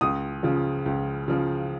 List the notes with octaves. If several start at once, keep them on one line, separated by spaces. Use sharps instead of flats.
C#2 D#6
C#3 F3
C#2
C#3 F3